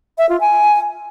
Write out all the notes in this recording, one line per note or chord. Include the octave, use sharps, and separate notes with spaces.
E5
F4
G#5